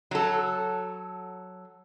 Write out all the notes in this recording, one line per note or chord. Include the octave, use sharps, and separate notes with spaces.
F#3 A4